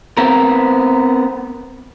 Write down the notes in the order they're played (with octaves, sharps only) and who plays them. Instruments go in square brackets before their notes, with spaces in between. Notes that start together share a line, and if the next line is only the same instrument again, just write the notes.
[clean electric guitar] B3 C4 A#4